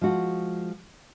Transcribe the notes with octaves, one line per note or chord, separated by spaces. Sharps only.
F3 G#3 F#4